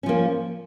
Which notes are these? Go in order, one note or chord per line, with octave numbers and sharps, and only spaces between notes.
F3 A#3 C#4